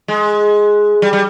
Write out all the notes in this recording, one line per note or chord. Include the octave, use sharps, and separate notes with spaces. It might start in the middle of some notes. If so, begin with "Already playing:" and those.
G#3
G3
G3